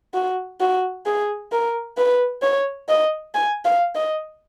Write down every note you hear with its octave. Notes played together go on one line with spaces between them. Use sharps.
F#4
F#4
G#4
A#4
B4
C#5
D#5
G#5
F5
D#5